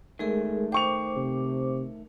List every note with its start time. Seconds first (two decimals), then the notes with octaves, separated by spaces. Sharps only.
0.19 D#3 G#3 A3 G#4 A#4
0.72 C5 G5 C#6 D6 F7
1.17 C3